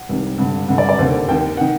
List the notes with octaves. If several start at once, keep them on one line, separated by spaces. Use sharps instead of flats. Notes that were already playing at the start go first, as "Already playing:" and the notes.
Already playing: F#5
C2 C3 D#3
G2 D3 F#5
G2 D3 F#5
D5
D5
D#2 D3 C5
D#2 D#3 G5
D#3 F#5